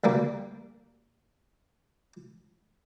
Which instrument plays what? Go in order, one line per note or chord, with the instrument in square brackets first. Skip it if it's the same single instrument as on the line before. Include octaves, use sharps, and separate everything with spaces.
[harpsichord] D2 G3 A#3